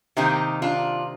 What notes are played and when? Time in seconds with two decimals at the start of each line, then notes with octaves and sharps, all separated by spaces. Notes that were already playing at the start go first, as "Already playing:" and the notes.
0.17 C3 D#3 A#3 D#4 G4
0.62 D4 F4